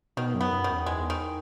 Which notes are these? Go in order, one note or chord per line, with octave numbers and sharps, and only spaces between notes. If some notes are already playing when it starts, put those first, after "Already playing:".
B2 D#3
F#2
B3
F#2
D#3
E2
E2 G#3
D#3